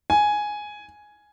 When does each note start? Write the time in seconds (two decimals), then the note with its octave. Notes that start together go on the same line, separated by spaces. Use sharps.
0.10 G#5